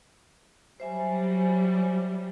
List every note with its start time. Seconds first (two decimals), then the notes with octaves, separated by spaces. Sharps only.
0.80 F#3 G3 C5 E5 G#5